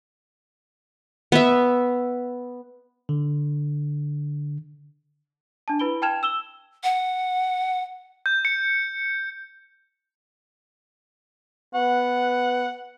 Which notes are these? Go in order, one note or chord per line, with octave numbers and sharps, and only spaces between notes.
B3 E5
D3
D4 A5
E4 B4 B5 D7 G7
G5 A5 F6 G#6 E7 F7
E6 E7 G7
F#5
G6
C#7
B3 F#5